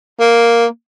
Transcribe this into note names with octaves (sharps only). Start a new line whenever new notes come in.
A#3